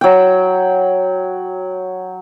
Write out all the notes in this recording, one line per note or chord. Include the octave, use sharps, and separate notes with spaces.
F#3 G5